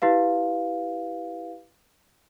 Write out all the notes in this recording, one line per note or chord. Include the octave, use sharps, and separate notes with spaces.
E4 G4 B4 F5